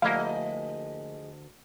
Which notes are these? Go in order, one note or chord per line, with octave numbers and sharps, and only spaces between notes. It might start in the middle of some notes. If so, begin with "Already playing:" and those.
D2 F3 A#3 E4 G#4 D#5 F5